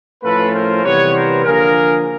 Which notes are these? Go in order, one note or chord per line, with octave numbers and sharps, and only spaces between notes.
A2 F3 A3 C#4 F4 A4 B4
A#4 C5
C3 E3 G3 B3 B4 C#5
A#4 C5
D3 F3 A#3 G#4 A#4